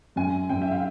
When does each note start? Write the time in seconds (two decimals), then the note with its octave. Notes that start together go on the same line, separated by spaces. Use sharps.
0.16 F#2 G#5
0.49 F#2 G5
0.62 E5
0.72 F5